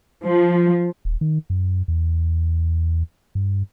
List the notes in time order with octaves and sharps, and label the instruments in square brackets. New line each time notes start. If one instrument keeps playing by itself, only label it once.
[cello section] F3
[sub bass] D#1
D#3
F#2
E2
G2